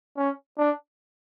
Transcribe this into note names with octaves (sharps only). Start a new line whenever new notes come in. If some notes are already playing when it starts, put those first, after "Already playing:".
C#4
D4